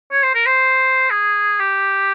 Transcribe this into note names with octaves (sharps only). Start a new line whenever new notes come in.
C#5
C5
A#4
C5
G#4
G4